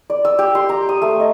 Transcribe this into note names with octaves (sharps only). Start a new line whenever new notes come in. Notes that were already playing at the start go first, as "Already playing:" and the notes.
D5
E6
G4
C6
A#5
D#6
A3
D#5